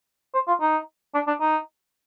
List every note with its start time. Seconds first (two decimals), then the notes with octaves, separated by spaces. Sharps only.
0.34 C5
0.48 F4
0.61 D#4
1.15 D4
1.27 D4
1.41 D#4